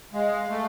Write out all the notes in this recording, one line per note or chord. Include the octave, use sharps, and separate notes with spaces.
G#3 F5
A3